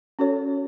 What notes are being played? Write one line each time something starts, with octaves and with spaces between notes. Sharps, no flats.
C#4 F#4 A4 C#5